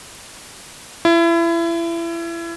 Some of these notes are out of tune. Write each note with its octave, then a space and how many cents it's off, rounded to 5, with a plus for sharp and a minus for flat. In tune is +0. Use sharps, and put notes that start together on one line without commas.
E4 +30